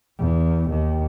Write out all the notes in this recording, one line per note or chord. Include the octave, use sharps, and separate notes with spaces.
E2
D#2